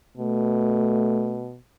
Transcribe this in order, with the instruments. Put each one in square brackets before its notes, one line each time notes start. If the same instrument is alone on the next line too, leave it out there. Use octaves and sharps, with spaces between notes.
[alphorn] B2 [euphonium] A3